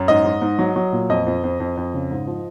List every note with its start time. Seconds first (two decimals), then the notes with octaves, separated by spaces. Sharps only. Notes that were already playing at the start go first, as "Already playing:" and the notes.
Already playing: F#2
0.08 G#2 D#5
0.25 G#2
0.42 G#2
0.59 F#3
0.76 F#3
0.93 A#2
1.09 F2 D#5
1.27 F2
1.44 F2
1.60 F2
1.77 F2
1.94 C#3
2.11 G#2
2.27 F3